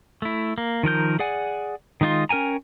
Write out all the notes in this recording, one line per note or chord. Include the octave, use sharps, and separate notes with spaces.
A3 E4
A#3
D#3 F3 A#4 G6
G#4 D5 F#5 G#5
D#3 G#3 D#4 F4 C6
C#4 A#4 G5 G#5 A#5